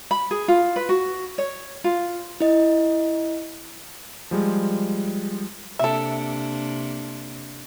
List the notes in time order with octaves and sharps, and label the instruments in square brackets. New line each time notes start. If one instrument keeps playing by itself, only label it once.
[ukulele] B5
G#4
F4
B4
F#4
C#5
F4
[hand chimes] E4 D#5
[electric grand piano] F3 G3 G#3
[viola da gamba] C3 A#3 D4 [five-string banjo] A4 E5